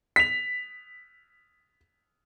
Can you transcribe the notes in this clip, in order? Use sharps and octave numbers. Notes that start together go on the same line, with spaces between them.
B6 F7